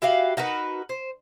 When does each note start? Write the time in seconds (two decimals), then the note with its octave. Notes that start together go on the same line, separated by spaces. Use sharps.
0.02 E4 F#4 G4 F5
0.37 D#4 F#4 A#4 B4
0.89 C5